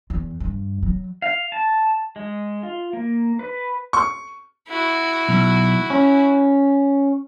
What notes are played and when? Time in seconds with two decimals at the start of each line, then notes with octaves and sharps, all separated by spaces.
0.10 E2
0.40 G2
0.83 F#3
1.22 F5
1.52 A5
2.16 G#3
2.63 F4
2.93 A#3
3.39 B4
3.93 C#6
4.68 E4 F#4
5.29 B1
5.90 C#4